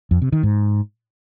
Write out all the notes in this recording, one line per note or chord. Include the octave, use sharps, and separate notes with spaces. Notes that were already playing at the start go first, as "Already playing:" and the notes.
F2
C3
D#3
G#2